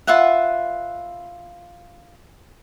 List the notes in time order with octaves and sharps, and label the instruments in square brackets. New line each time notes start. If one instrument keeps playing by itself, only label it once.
[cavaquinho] F4 B4 E5 F#5